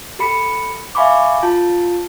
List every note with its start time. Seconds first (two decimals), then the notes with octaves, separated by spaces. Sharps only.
0.19 G4 A4 B5 C#7
0.95 E5 F5 G#5 B5 C#6 D6
1.43 F4 A5